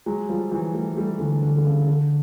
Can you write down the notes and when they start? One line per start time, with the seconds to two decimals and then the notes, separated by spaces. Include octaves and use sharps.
0.06 F#3 G#3
0.29 F3 G3
0.51 E3 F#3
0.74 G3 A3
0.96 G3 A3
1.19 D3 E3
1.42 D3
1.57 D3
1.65 C#3
1.87 D3